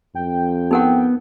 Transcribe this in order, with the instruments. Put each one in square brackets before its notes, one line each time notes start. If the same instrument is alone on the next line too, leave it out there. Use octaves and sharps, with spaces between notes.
[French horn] F2 [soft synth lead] G5
[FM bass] B3 [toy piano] D#4 A#4 F#5